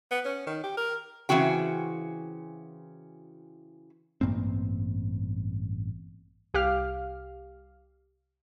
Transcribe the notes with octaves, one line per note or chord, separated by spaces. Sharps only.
B3
C#4
D#3
G4
A#4
C#3 E3 C4 F#4 G5
A1 G2 A#3 C4
C2 G4 F5 F6